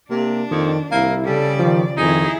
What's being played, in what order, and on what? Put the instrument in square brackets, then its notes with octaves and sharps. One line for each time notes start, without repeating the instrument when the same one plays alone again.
[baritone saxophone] C3 [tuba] A#3 [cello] D4
[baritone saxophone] F2 [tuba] D#3
[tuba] C2 [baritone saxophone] A#3 [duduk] E4
[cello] C#3 D5 [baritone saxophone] G3 [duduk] A4
[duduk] D#3 [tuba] F3
[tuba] F2 [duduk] D#3 [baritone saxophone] D#4 [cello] E4 G#4